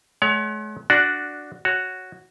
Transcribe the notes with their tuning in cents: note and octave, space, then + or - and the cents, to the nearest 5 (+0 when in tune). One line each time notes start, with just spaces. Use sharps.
G#3 +45 C#5 +30 G5 -40
D4 +5 F#4 +0 D5 +0
F#4 +0 C#5 +0